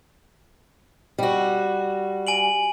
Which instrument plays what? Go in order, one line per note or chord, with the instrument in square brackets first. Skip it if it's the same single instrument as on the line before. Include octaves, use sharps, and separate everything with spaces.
[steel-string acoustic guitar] G3 F#4
[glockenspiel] G#5 D7 F#7